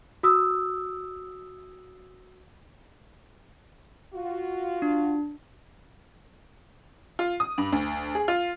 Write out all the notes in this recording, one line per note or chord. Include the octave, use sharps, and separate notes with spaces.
F#4 D#6 E6
F4 F#4
D4
F4
D#6
G2
D2
G#4
F4